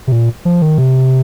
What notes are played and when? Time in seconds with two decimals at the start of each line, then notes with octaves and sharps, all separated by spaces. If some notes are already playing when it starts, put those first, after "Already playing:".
0.07 C3
0.12 A#2
0.45 F3
0.62 D#3
0.78 C3